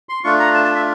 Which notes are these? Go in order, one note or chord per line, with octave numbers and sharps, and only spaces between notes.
C6
A3 D4 F4 C#6
A#5
A5
A5
E5